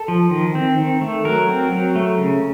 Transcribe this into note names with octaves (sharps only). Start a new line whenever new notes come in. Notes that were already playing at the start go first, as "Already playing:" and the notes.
Already playing: A4
F3
D#3
C4
D#3
A3
F#3 A#4
C4
F#3
A3
C#3